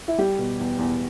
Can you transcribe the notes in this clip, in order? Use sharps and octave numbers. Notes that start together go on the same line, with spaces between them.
E4
G3 G4
B2
E2
E2